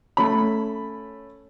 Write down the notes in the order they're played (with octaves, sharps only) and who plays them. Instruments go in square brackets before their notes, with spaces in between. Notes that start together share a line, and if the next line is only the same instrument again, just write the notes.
[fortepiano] A3 C#4 B5